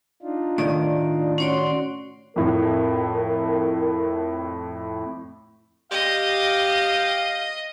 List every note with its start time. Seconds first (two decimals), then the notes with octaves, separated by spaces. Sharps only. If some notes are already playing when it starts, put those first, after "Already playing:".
0.22 D4 D#4 F4
0.58 A2 D#3 D5
1.38 C#4 F#4 C#5 D5 C6
2.36 F2 A2 A#4
5.91 G4 D#5 F5